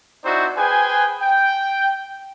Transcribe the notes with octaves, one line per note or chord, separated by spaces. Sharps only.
C4 D#4 E4 F#4 C5 D5
G#4 B4 C5 G5 G#5
G5